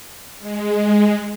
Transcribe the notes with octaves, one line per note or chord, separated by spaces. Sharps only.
G#3